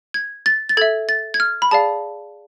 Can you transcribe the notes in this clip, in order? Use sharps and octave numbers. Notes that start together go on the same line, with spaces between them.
G#6
A6
A6
A4 E5 G#6
A6
G#6
F6
B5
G#4 D5 F5 A5